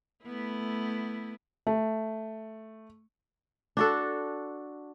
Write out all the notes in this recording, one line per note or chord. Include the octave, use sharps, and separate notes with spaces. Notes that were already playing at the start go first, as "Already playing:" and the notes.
A3 B3 E4
A3
D4 F#4 A4